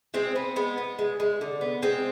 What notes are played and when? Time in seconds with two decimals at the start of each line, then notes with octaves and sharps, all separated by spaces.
0.14 G#3 C4
0.36 B3
0.56 G#3 B3
0.78 B3
0.99 G#3
1.20 G#3
1.41 D3
1.61 B3
1.82 G#3 C4